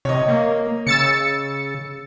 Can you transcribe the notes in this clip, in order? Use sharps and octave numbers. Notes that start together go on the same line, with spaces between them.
C3 C#5 D#5
A#3
C#3 E6 A6 C#7